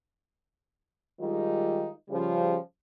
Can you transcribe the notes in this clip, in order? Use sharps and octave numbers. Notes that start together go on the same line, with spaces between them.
D#3 G3 G#3 D#4 F4
C#3 F3 G3